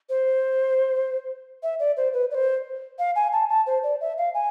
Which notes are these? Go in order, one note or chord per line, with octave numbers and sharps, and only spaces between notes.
C5
E5
D5
C5
B4
D5
C5
F5
G#5
A5
A5
C5
D5
E5
F5
G#5